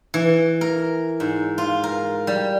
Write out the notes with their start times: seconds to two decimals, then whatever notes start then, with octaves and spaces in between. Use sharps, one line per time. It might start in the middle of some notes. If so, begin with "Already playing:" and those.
0.14 E3
0.61 A#4
1.20 G#2
1.58 F4
1.84 A#4
2.27 G3